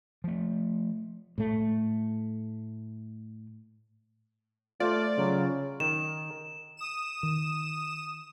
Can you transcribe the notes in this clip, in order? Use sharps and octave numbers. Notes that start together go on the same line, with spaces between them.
F3 A3
A2 A3
A3 F4 C5 D5
C#3 F#3
D#3 E7
D#6 E7
D#3